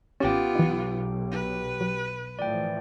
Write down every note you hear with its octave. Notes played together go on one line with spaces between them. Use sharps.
A1 B3 C#4 F4 G4 G5
B1 E3 D#4
B4
F#3
A2 E3 F3 D5 G5